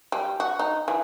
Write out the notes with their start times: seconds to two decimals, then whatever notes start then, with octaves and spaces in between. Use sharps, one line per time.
0.12 G3
0.40 F#4
0.59 D#4
0.88 E3